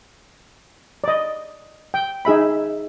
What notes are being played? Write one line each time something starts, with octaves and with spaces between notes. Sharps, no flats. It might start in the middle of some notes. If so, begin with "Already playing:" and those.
D5 D#5
G5
D#4 G#4 E5 B5